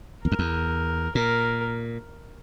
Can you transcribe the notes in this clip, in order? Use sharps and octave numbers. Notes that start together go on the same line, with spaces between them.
E2 A#4
F2
E2
A#2 A#4